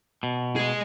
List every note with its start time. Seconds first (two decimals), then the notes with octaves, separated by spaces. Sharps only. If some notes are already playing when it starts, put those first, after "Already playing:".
0.23 B2
0.56 G#4 D#5